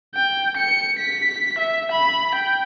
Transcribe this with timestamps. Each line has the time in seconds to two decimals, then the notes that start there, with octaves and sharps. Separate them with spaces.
0.15 G5
0.57 C#7
0.99 B6
1.59 E5
1.92 B5
2.35 G5